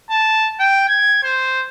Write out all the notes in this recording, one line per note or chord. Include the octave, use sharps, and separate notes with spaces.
A5
G5
G#6
C5